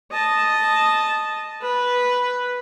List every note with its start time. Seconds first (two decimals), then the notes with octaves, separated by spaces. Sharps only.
0.12 D#5 A5
1.62 B4